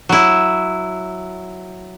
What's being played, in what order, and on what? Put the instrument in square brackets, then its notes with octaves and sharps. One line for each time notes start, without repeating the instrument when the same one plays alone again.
[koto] F#3 E4